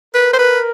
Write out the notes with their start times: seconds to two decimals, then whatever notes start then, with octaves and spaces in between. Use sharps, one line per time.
0.14 A#4 B4
0.33 C5
0.39 B4